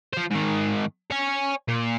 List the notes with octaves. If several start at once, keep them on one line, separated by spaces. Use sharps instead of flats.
F3 C5
G#2 D#3
C#5 G#5
A#2